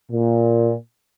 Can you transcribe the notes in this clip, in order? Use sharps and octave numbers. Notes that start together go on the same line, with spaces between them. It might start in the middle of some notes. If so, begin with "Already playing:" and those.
A#2